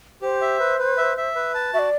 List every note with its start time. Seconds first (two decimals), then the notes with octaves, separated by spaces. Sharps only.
0.22 G4 C5
0.41 E5
0.59 B4
0.79 B4
0.98 E5
1.17 E5
1.35 B4
1.54 A5
1.74 F#4 E5
1.79 D5